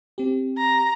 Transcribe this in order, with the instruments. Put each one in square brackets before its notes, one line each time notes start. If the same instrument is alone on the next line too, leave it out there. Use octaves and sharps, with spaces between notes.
[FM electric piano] C4 G4
[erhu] A#5